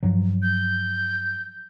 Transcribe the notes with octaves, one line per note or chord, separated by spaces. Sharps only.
G2 F3 F#3
G6